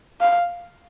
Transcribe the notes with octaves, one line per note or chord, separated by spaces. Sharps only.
F5